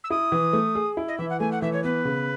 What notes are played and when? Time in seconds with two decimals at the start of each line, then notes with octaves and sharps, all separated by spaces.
0.04 E6
0.10 E4 D#6
0.32 E3
0.53 A3
0.75 G#4
0.97 E4
1.08 D#5
1.18 E3 E5
1.30 F#5
1.40 A3 G#5
1.52 F#5
1.62 E3 E5
1.73 C#5
1.84 B3 B4
2.05 C#3